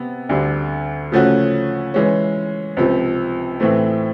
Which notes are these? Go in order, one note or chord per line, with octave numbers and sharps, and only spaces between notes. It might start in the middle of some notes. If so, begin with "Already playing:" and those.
Already playing: C3 B3
D2 D3 G3
C#3 F3 A3 C#4 F#4
E3 G#3 C#4
C#2 C3 F3
A2 E3 A3 C4